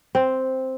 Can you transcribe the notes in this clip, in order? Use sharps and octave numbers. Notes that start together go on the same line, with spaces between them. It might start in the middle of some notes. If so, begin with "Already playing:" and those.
C4